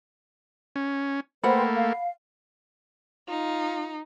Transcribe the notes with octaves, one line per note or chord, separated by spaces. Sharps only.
C#4
A3 A#3 B4 C5 F#5 G5 B5
F5
D#4 F4